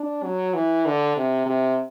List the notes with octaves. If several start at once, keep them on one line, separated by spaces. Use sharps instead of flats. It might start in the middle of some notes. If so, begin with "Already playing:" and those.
Already playing: D4
F#3
E3
D3
C3
C3